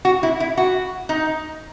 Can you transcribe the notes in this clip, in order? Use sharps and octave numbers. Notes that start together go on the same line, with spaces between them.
F#4
E4
E4
F#4
D#4